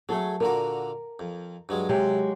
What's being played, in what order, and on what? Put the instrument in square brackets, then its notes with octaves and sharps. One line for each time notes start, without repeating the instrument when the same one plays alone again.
[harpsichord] F#3 A3 [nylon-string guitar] G#4 A4
[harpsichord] A#2 D3 F#4 [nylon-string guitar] A#4
[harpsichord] F2
G2 F#3 G#3
[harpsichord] C3 [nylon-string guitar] F#3 G#3 G4